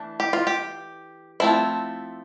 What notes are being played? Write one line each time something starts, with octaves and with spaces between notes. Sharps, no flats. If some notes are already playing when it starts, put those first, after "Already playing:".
Already playing: E3 A3 D4
G4
F4
G4
F3 A3 C4 E4